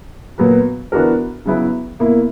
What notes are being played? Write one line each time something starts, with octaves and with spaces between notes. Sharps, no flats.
A#2 F#3 B3 F#4 B4
E3 B3 D4 F#4 A#4
C#3 F#3 B3 E4 B4
B2 A#3 E4